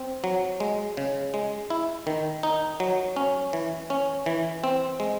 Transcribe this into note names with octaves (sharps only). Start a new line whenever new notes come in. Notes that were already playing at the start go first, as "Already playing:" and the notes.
Already playing: C4
F#3
G#3
C#3
G#3
E4
D#3
D#4
F#3
C#4
E3
C#4
E3
C4
G#3